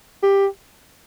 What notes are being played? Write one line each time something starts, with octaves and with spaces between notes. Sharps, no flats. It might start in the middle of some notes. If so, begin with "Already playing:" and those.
G4